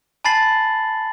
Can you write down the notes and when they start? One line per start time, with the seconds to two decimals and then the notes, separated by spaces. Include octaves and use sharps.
0.24 G#5 A5 B5 A6 C7 F#7